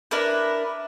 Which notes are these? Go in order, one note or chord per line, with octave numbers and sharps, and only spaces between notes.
D4 E4 A#4 B4